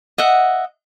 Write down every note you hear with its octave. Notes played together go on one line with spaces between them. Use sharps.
D#5 E5 F#5